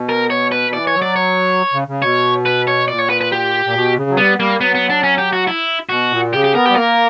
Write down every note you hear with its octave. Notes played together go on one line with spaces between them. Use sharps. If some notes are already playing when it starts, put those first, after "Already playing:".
Already playing: B2
A#4
C#5
B4
E3 D5
C#5
F#3
D5
C#5
C#3
C#3
B2 C#5
B4
C#5
A#2 D5
C#5
B4
B4
G4
A#2
B2
C#3
F#3
G3 B3
G3 A#3
F#3 B3
B3
D4
C#4
G4
F#4
E4
B2 F#4
A#2
C#3 G4
G4
B3 A#4
G4
G3
A#3 A#4